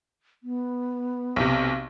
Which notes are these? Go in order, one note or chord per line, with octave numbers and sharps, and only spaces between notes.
B3
B1 C3